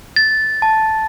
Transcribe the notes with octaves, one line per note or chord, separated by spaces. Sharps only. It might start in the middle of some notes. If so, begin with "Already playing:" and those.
A6
A5